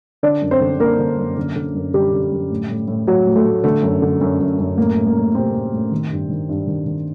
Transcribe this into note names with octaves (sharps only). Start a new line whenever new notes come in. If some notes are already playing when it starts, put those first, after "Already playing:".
D3 D4 D5
F#2
C4 C5
D3
D3 A#3 A#4
D3
F#2
D3
D3
F#2
D3 G3 G4
D3
F#2
A2
A2
A2
A2 F#3 F#4
A2
A3
A2
D3 A3
F#2
D3
F#2
F#2
F#2
A2 A#3
A2
A#3
A2
A2 C3 C4
A2
A2
D#3
G2
D#3
G2
D#3
D#3